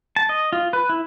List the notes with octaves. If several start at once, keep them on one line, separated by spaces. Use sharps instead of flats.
A5
D#5
F4
B4
E4